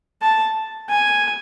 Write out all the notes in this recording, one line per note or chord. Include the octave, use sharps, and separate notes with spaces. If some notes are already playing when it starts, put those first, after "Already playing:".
A5
G#5